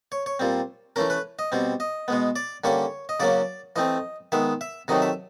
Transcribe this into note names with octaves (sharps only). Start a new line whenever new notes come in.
C#5
C#5
A#2 G3 C4
E3 A3 C#4 A#4
B4
D#5
B2 G3 C4
D#5
B2 G#3 B3
D5
D3 G3 A#3 C#4 C#5
D#5
C#3 F#3 A#3 C#4 D5
E3 A3 C4 D#5
D#3 G#3 B3 E5
E5
C3 D#3 F#3 A3 D#5
E5